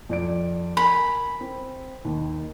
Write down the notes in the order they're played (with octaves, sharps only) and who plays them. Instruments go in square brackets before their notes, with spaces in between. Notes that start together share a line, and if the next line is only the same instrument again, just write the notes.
[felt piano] F2 D5 D7
[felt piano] A#4 G#5 [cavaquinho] B5
[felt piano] C4
D#2 D#3